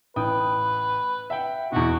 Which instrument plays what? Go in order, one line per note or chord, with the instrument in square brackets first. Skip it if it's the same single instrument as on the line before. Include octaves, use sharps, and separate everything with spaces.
[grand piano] A1 G5 D#6 [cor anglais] B4
[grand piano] E5 F#5 G5
[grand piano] E2 B2 [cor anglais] F#4